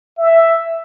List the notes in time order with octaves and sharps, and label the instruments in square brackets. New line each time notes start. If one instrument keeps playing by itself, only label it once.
[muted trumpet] E5